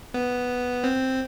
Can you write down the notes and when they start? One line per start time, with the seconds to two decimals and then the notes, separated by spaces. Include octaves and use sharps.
0.14 B3
0.84 C4